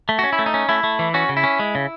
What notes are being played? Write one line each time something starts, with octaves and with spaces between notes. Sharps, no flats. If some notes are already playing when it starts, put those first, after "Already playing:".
A3
C#4 F#4
E4
A3
D#4
C#4
A3 E4
A3
E3
C#4 F#4
C#3
E4
C#4
G#3
C#3